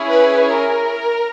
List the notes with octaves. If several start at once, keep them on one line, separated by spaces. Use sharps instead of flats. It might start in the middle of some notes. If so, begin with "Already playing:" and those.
Already playing: C#4 E4 G#4
B4
A#4